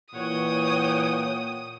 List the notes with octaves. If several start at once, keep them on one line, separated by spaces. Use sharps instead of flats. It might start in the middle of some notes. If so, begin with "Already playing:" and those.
A#2 E3 C#5 F#5 G5 D#6